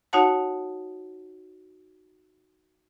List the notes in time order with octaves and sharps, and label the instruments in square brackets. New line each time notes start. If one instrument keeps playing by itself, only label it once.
[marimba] D#4 F#4 C#5 F#5 A5